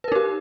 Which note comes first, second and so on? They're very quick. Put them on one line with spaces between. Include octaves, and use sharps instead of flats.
B4 A#4 D#4 G4